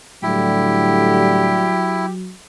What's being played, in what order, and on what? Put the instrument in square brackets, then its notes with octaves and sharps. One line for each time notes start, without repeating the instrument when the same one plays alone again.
[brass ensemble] A2 D3 G3 [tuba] F#3 [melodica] E4 [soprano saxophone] G4